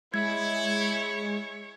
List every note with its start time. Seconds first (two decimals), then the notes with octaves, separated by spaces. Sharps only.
0.14 G#3 E4 C#5 G#6